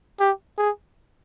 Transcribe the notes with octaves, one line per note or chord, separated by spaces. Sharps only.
G4
G#4